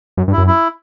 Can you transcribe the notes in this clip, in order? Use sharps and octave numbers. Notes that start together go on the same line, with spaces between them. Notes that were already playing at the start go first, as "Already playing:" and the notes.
F#2
G2
E4
F#2
E4